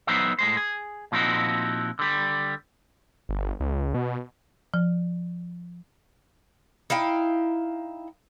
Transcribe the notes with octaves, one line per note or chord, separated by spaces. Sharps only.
F#3 B3 D#4 B4 C5 E5
A2 G#3 C5
G#4
A#2 F3 C4 D#4 E4 F#4
D3 G3
G1
C#2
B2
F3
D#4 E4 F5 G5